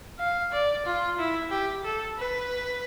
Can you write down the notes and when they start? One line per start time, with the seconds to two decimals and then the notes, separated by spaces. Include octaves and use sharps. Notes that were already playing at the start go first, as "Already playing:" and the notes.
0.19 F5
0.52 D5
0.86 F4
1.19 E4
1.51 G4
1.84 A4
2.18 B4